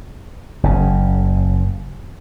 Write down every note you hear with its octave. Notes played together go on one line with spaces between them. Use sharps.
F#1 C#3